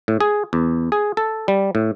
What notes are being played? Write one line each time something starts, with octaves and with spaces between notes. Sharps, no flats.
A2
G#4
E2
G#4
A4
G3
A2